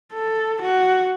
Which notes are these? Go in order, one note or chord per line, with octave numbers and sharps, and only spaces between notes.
A4
F#4